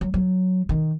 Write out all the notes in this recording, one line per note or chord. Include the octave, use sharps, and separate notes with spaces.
F#3
F#3
D#3